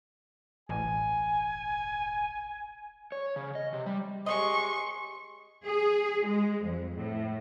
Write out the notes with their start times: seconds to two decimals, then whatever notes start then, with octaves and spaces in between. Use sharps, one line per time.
0.69 E1 A1 G#5
3.12 C#5
3.36 C#3
3.55 D#5
3.73 C3
3.86 G3
4.26 G#3 G4 D#5 C6 C#6
5.65 G#4
6.25 G#3
6.64 F2
6.96 A2